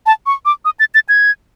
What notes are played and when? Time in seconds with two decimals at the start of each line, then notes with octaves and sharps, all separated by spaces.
0.06 A5
0.26 C#6
0.45 D6
0.65 D#6
0.80 A6
0.95 A6
1.09 G#6